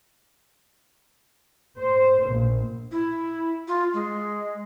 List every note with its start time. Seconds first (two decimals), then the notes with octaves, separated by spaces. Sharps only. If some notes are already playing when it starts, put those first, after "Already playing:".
1.78 C5
2.28 A#1
2.92 E4
3.68 F4
3.94 G#3